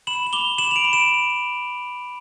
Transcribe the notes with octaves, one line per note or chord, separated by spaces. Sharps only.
B5 E7 F#7
F#7
D6 F7 G7
B5 E7 F#7
F7
D7 E7
B5
D7 E7